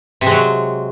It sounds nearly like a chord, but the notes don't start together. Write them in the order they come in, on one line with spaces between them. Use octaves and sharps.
C3 G#3 F#3